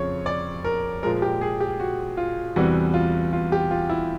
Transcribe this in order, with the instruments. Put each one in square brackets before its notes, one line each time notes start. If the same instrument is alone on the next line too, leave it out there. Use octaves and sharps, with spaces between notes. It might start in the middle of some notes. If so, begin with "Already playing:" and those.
Already playing: [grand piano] F2 C#3 F3 C#5
D5
A#4
A#2 F3 G#3 A#4
G4
G#4
G4
F#4
F4
E2 C3 E3 G3 F#4
F4
F4
G4
F4
E4